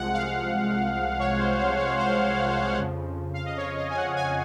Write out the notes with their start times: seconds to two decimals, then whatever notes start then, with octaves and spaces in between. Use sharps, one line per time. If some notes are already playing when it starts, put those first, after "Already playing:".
Already playing: C2 C3 F3 G#3 F#5
0.13 F5
1.19 C#5
1.39 C5
1.58 C5
1.78 C#5
1.98 C5
2.78 F2 C#3 F3
3.34 F5
3.45 D#5
3.57 C#5
3.77 D#5
3.90 G#5
3.97 F#5
4.16 G#5